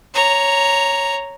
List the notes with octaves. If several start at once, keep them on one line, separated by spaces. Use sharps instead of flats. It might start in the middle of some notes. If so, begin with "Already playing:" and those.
C#5 A#5